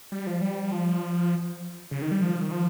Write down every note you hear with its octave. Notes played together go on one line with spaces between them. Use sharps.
G3
F3
G3
F3
C#3
D#3
G3
F3
D#3
F3